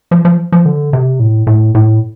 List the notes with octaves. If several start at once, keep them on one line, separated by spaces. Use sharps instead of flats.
F3
F3
F3
D3
C3
A2
A2
A2